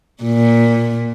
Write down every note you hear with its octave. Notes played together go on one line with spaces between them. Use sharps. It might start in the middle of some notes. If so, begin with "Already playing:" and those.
A#2